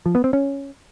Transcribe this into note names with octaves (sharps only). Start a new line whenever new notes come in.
F3
B3
C4
C#4